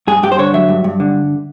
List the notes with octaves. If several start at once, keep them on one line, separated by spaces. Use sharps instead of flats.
G2 G#4
G2 G4
C5
D3 C#5
F#3 E5
G2
G2
D3